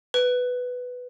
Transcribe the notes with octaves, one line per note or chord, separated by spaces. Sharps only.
B4